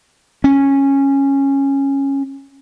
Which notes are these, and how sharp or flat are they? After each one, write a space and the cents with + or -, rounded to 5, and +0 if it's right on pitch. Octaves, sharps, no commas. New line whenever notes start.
C#4 -10